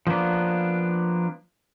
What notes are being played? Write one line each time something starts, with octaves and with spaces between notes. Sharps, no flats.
F3 A#3 B3 D4